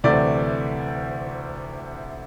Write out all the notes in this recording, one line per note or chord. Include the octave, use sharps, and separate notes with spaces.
D2 C3 E3 A3 D5